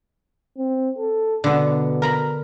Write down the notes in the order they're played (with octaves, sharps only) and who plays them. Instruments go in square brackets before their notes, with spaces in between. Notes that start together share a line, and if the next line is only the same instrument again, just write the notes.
[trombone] C4
A4
[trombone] B2 [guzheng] D3 B3
[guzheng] A#4 A#5 B5